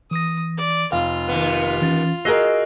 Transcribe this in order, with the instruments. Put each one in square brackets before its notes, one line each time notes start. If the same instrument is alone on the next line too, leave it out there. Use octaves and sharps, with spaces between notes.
[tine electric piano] E3 A#6 [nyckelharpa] D#6
[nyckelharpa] D5
[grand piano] F1 [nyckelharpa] F4 [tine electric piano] F5
[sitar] D#2 B3
[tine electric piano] E3 C#4 A6
[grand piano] F#4 G#4 A#4 [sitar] D#5 [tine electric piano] E6 C7